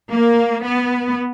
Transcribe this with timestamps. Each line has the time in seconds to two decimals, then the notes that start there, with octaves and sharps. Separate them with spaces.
0.11 A#3
0.63 B3